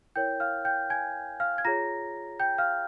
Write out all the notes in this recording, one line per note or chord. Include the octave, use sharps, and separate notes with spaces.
E4 A#4 C#5 G5 G6
F5 F6
G5 G6
G#5 G#6
F5 F6
G#6
F4 G#4 C#5 A#5 A#6
G5 G6
F5 F6